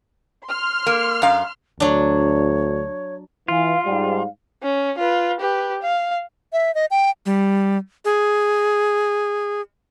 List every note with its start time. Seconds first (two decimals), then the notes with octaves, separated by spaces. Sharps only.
0.46 C6 F6
0.86 A#3
1.22 F#2 F5
1.80 D2 F#3 D4 C#5
3.48 E3 F4 F5
3.85 G#2 G3 F5
4.62 C#4
4.98 F4 B4
5.40 G4 B4
5.82 F5
6.53 E5
6.75 D#5
6.91 G5
7.26 G3
8.05 G#4